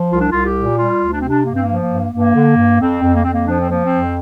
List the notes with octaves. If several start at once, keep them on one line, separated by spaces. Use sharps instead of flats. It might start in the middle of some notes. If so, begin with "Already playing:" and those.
Already playing: F3
C2 F4
D4
C2 F4
G4
A#2
G3 F4
D2
D4
C3 C4
D4
G2 A#3
C4
F3 A#3
A#3
G2
G2 A#3
D3
G2
F2 C4
F2
A#3
F2 C4
A#3
F3 D4
C4
F3 A#3
C4
F2